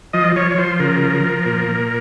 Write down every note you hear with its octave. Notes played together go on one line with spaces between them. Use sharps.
F3 D#5
F3 C#5
C#5
F3 C5
C#3 A#4
F3
F3
A#2
A#2